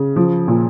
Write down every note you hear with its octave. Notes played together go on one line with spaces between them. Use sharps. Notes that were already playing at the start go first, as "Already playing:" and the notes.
Already playing: C#3
F3
A#2